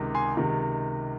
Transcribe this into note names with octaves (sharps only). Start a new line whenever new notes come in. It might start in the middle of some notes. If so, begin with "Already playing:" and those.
Already playing: C#2 C3 D#3
G#5 C6
C#2 C3 D#3